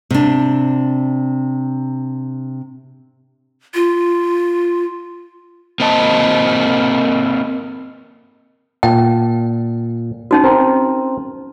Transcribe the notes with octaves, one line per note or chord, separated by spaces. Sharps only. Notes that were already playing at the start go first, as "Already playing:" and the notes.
C3 D4
F4
A#3 C4 D#5 A5
A#2 G5 A5
C#4 D#4 F#4
C4 A#4